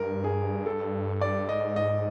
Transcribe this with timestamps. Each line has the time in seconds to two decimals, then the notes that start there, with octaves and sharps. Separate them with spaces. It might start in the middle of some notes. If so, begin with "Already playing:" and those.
Already playing: G2 A#4
0.24 G#4
0.66 A4
1.21 D5
1.49 G#2 D#5
1.76 D#5